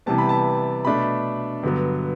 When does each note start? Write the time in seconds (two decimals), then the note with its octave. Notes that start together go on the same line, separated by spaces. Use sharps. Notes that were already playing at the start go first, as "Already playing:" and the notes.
0.06 C3 E3 G3 B3 A5
0.18 B5
0.29 A5
0.85 B2 A3 D4 B5
1.63 G2 D3 F#3 B3